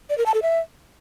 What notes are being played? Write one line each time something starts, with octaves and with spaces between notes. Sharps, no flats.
D5
A#4
A5
A4
E5